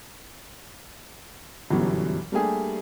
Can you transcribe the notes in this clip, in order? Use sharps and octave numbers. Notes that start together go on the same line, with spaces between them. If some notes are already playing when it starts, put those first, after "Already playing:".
G1 F#2 B2 E3 F#3 G3
G3 A3 A#3 D4 G4 G#4